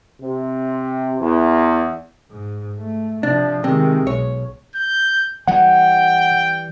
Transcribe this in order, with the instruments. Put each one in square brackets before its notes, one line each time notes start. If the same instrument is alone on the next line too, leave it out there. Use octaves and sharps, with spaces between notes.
[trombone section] C3
E2
[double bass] G#2
A3
[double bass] C3 F3 [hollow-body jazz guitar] D4
[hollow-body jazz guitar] C3 [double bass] D#3 G#3
[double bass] B1 [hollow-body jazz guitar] C#5
[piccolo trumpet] G6
[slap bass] E3 G3 [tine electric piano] F#5 [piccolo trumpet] G5